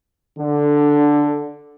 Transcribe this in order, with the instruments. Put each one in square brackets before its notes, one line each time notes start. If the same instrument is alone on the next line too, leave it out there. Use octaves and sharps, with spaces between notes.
[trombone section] D3